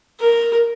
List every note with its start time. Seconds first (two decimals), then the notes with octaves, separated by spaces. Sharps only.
0.20 A#4